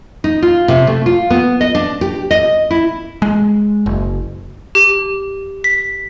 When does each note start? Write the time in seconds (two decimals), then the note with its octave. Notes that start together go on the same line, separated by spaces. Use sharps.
0.24 D#4
0.42 F4
0.68 C3
0.87 A3
1.06 F4
1.30 B3
1.61 D#5
1.75 D4
2.01 G4
2.31 D#5
2.70 E4
3.22 G#3
3.86 F#1
4.75 G4
5.64 B6